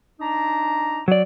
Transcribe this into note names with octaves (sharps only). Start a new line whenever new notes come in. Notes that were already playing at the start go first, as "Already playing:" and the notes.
D4 D#4 A#5
F#3 D5